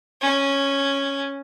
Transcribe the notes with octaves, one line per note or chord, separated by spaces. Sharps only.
C#4